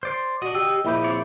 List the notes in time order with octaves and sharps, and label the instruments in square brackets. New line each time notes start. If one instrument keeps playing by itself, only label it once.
[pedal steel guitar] C5 D5 C6
[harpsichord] D4 F#4 [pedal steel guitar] D#5
[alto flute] G4 [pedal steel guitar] D#5 [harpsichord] G5 [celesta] E6
[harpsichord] A#1 D6 [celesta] E4 B5 G6 [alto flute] E5
[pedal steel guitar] C4 C#5 D5